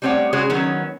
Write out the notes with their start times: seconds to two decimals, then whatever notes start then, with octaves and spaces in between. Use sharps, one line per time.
0.02 G3 A3 C4 C5 C#5 F#5
0.33 C#3 G#3 C#4 F#4 G#4 C#5
0.50 D#3 F#3 B3 C#4